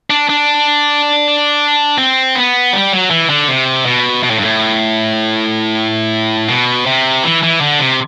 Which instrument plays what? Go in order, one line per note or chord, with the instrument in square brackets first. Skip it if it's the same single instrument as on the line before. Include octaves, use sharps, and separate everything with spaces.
[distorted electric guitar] D4
D4
C4
B3
G3
F#3
E3
D3
C3
B2
B2
A2
G2
A2
B2
C3
E3
E3
D3
C3